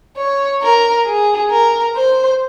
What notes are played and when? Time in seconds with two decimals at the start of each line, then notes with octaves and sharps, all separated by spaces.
0.17 C#5
0.63 A#4
1.07 G#4
1.51 A#4
1.96 C5